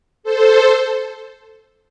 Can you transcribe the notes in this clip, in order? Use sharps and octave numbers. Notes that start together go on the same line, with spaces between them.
A4 C5